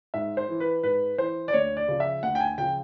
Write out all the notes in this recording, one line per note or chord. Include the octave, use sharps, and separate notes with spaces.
G#2 E5
C5
E3
B4
G#2 B4
E3 C5
D5
D2 C#5
D5
C#3 F3
E5
D2 F#5
G5
G#5
C#3 F3 G5